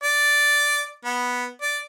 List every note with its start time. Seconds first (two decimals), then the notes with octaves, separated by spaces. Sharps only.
0.04 D5
1.05 B3
1.62 D5